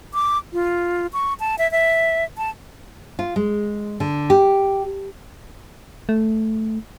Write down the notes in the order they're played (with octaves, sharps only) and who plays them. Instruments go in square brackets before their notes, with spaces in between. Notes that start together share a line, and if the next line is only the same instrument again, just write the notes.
[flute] D6
F4
C#6
A5
E5
E5
A5
[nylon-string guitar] F4
G#3
D3
G4
[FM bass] A3